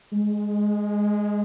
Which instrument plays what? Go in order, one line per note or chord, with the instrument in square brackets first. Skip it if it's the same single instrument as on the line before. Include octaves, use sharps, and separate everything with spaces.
[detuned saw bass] G#3